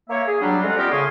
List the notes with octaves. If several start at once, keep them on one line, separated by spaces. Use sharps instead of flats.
A#3 C#5 E5
G#4
F#3 G3 D4
C3 G#3 C#4 F4 F#4 A4
G3 B3 F4 G4 A#4 F6
A2 C#3 G#4 G#5 C6 C#6